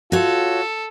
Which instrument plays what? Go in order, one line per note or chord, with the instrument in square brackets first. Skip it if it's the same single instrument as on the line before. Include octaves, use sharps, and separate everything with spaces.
[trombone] F4 [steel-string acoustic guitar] F#4 C#5 [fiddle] A4